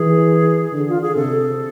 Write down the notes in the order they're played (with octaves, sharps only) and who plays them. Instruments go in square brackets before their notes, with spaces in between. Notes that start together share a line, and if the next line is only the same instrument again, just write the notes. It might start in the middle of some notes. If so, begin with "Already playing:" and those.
Already playing: [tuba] E3 [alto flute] G#4
[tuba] D3
[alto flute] F4
G#4
[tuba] C3 [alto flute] A4